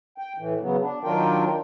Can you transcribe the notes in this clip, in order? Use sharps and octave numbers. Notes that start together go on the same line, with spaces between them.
G5
A2 E3
C#3 F#3 B3
D4
D#3 F#3 D4 F4 A#4 G5